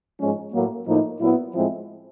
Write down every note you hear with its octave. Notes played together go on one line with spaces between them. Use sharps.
G#2 F3 G#3 C#4
A2 F#3 A#3
A2 F3 A#3 D#4
A#2 F#3 B3 E4
A2 F3 G#3 C4 E4